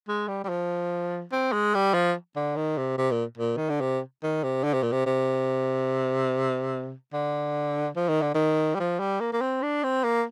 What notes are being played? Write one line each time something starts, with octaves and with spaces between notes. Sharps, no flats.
G#3
G3
G3
F3
C4
G#3
G3
F3
D3
D#3
C3
C3
A#2
A#2
D#3
D3
C3
D#3
C3
D3
C3
A#2
C3
C3
D3
F3
D#3
D3
D#3
G3
F3
G3
A#3
A#3
C4
D4
C4
A#3